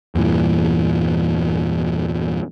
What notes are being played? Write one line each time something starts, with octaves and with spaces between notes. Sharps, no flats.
E2 G2 A#2 E3